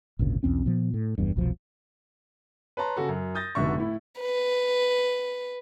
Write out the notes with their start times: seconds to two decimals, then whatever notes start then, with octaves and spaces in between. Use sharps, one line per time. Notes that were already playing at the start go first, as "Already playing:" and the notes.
0.19 G#1 D2 A#2 C#3
0.43 B1 E2 C4 C#4
0.66 A#2 F3 B3
0.94 A2
1.18 F#1 E2 G2
1.36 F1 C2 B2 F3
2.77 B4 C#5 A5 A#5 C6
2.96 C#3 F#4 A4
3.09 F#2
3.35 D#6 G6 A6 A#6
3.55 F1 G#2 B2 D3 E5 C#6
3.77 A2 E4
4.20 B4